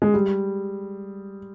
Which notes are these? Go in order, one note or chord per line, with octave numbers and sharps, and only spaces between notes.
G#3
G3